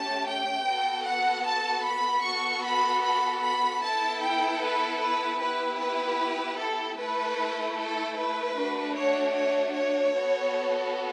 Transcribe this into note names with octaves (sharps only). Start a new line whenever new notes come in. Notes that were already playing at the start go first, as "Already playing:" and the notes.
Already playing: A3 C#4 G4 A5
G5
B3 F#4 A4
F#5
A5
B5
B3 F#4 A4 C#6
B5
B5
B5
B3 E4 A4 A5
G5
B4
B4
B3 E4 G4 B4
B4
A4
A3 E4 A4 B4
A4
B4
A3 D4 F#4
C#5
C#5
C#5
B3 F#4 A4